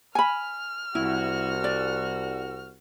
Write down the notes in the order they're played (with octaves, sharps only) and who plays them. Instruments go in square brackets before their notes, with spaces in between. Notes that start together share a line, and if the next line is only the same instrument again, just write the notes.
[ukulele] G#5 B5 [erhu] F6
[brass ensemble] C2 F#4 [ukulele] E4
[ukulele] D5